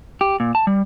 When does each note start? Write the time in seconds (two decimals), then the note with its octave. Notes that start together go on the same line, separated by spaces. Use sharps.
0.21 G4
0.40 A#2
0.55 A5
0.67 G3